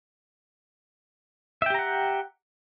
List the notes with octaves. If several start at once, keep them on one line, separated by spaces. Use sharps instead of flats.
G4 E5 F#5 G5 A#5